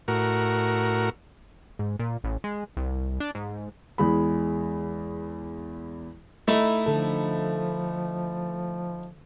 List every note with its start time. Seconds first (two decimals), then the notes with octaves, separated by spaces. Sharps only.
0.08 A2 F#4 A#4
1.79 G#2
1.99 A#2
2.24 A1
2.44 G#3
2.77 C2
3.20 D4
3.35 G#2
3.98 E2 G#3 B5
6.48 A3 D#4 E4
6.86 D3 F3 A4